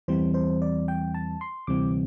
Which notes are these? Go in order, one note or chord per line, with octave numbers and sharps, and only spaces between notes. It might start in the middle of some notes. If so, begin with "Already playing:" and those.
E2 E3 G3 C4 C5
C5
D5
G5
A5
C6
D2 C3 E3 G3 C4 D6